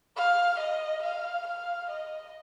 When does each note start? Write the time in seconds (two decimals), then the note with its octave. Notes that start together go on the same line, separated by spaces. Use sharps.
0.17 F5
0.60 D#5
1.03 F5
1.47 F5
1.90 D#5